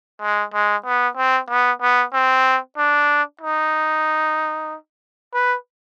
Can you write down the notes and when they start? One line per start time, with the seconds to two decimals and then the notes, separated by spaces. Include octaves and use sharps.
0.21 G#3
0.54 G#3
0.86 B3
1.17 C4
1.49 B3
1.82 B3
2.13 C4
2.78 D4
3.41 D#4
5.34 B4